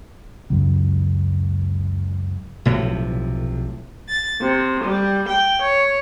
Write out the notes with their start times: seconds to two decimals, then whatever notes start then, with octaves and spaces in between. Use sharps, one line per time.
0.50 C#2 F#2
2.65 B1 A2 C3 F3
4.08 A6
4.42 C3
4.83 G3
5.28 G5
5.62 C#5